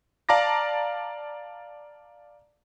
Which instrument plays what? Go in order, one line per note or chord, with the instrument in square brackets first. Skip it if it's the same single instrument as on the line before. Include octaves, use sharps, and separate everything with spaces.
[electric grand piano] D5 F5 A5 A#5 D6 A#6